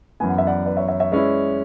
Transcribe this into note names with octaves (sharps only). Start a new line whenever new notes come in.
F#2 E3 B3 G#5
F#5
E5
D5 F#5
B4 D5
C#5 E5
C#5 E5
C#5 E5
G#3 C#4 E4 B4 D5